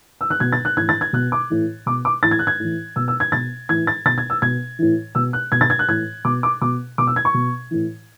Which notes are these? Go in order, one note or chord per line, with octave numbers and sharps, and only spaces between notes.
E6
F#6
B2 G#6
A6
F#6
A2 E3 G#6
A6
G#6
B2 F#6
D6
A2 E3
B2 D6
D6
A2 E3 A6
G#6
F#6
G#6
A2 E3
B2 E6
E6
G#6
B2 A6
A2 E3 G#6
A6
B2 A6
G#6
E6
B2 G#6
A2 E3
B2 E6
F#6
B2 G#6
A6
G#6
F#6
A2 E3 G#6
B2 D6
D6
B2 D6
B2 D6
E6
G#6
C#6
B2
A2 E3